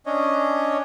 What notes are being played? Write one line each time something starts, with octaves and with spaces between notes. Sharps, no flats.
C#4 D4 C#5 D#5